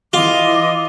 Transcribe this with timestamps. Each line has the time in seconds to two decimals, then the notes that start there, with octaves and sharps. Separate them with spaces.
0.13 E3 F4 D#5 C6 D6